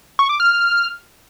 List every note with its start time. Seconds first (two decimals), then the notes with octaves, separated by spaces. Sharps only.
0.19 C#6
0.29 D6
0.40 F6